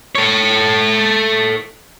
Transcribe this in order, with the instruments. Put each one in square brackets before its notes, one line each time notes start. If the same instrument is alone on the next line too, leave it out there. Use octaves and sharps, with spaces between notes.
[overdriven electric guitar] A4 C#5